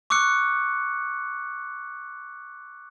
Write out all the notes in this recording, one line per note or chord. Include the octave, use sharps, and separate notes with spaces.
C#6 D6 E6 F#6 C#7